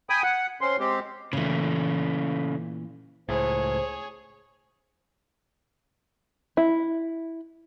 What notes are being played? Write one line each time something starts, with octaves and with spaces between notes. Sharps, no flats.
G5 G#5 B5 D#6
F#5
C4 C#4 C6
G#3 C4 G4
A#2 C#3 E3 A3
C#2 A2 G#4 C5 C#5
E4